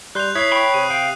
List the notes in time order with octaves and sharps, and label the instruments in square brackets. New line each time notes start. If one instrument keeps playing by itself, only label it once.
[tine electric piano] G3 C6 G6 [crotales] F#6 F7
[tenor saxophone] E4 [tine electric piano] C#5 G#6 B6 [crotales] D#6 C7
[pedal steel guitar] G5 B5 C#6
[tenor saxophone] C3 [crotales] D#7
[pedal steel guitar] F5 [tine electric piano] G5